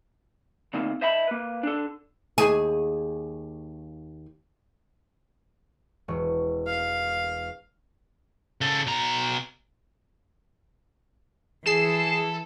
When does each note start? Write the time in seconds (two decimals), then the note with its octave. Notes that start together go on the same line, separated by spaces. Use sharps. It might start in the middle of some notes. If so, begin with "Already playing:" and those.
0.74 D3 A3 A#3 C4 D#4
1.01 C5 D#5 E5 A5 B5
1.27 A#3 B4
1.63 D4 A4
2.38 D#2 G#4
6.08 E1 C#6
6.67 F5
8.61 C#3 A4
8.87 B2 A#5
11.66 E3 G#4 A4 C7 E7